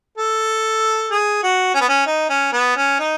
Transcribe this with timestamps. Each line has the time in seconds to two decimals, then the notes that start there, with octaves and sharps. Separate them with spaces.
0.18 A4
1.11 G#4
1.43 F#4
1.74 C#4
1.81 B3
1.88 C#4
2.06 D#4
2.29 C#4
2.53 B3
2.76 C#4
2.99 D#4